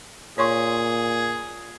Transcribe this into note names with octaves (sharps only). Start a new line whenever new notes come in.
A#2 G#4 C#5 C6 C#6